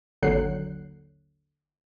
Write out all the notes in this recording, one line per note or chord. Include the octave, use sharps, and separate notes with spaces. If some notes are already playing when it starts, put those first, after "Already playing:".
G#1 D#2 D3 F#3 F#6 C7